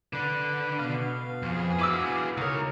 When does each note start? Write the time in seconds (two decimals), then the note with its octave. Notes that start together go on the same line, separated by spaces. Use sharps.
0.13 D3 D4 B4 D6
0.79 B2 B3 F5
1.42 F2 B3 G#4
1.79 E4 F#4 G#5 D6 E6
2.37 C#2 D#4 A#4 C#5